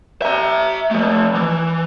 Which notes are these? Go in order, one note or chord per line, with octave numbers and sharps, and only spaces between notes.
E5 A#5
F3 A3
E3